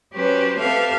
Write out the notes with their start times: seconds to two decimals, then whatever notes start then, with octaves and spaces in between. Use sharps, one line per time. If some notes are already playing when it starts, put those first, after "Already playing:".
0.13 F#3 C#4 G4 B4 C5
0.60 C4 G4 A4 B4 E5 F5